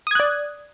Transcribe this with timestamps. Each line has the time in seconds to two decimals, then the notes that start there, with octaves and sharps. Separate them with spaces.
0.07 D#6
0.11 G#6
0.15 F#6
0.20 D5